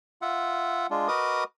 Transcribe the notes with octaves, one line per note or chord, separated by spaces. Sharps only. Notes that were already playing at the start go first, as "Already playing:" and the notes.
F4 E5 F#5
G#3 D4 F4
F#4 A#4 B4 D#5 D6 D#6